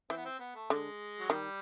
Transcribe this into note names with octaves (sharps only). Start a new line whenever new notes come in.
E3 C4
B3
C4
B3
A3
D3 G#3
F#3
D#3 G3